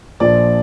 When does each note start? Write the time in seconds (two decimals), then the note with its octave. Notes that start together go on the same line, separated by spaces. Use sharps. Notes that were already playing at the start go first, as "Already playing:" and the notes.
0.20 A#1 A#2 F3 D5